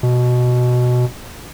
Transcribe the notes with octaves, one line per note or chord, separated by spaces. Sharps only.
B2